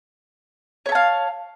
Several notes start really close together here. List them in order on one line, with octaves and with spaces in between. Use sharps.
C#5 E5 A5 F5